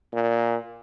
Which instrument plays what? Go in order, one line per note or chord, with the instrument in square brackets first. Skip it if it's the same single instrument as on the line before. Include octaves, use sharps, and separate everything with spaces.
[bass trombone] A#2